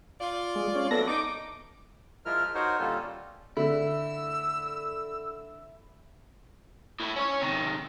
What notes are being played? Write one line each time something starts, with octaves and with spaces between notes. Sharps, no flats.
F4 D5
G#3
C#4
F#2 B3 E4 A4 A#6
D#4 D6
F3 G#3 E4 F4 A#4 F6
D#4 F#4 A#4 C5 C#5
A#2 D3 G3 C#4 F4 A4
D3 A3 E4 E6
A2 E4
C#4 C#5
C3 D#3